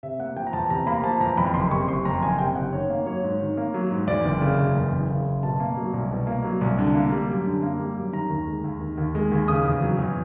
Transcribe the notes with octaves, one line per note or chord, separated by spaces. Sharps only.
C3 E5
A#3 F#5
F3 G5
A#5
E2 A5
C3 A#5
A#3 B5
F3 A5
E2 A#5
F2 B5
F#1 C6
C3 C#6
F#1 C6
F2 A#5
F#1 G#5
C3 G5
F#1 F#5
D#3 C#5
A#3
F#3 C#5
G#2
D#3
A#3
F#3
G#2
E2 D5
F#1
C#3
F#1
E2
F#1
C#3
F#1
B2 A5
A#3
F#3
C2
B2
A#3
F#3
C2
D3
A#3
G3
F#2
D3
A#3
G3
F#2
D#3 A#5
D#2
G#3
D#2
D#3
D#2
G#3
D#2
C#3 D#6
E2
F#3
E2